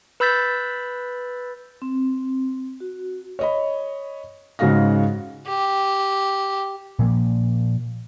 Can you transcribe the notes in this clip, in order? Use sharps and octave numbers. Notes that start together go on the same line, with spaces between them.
B4 B5 E6 G6 A6 B6
C4
F#4
C#5 D#5 B5
G#2 C#3 G#3 F#4 F5 A#6
G4
A#2 F3 A#3